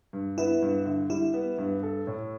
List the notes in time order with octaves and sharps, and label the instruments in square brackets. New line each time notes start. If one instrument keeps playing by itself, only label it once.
[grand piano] G2
[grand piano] B3 [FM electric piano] E4
[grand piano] G2
D3
[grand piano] G3 [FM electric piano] E4
[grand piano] B3
G2
A4
A2